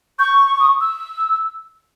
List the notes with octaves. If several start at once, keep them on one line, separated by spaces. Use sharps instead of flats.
C#6 G6
D#6
E6